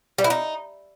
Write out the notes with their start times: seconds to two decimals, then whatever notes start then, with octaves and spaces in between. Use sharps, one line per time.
0.18 G3
0.24 E4
0.30 D#4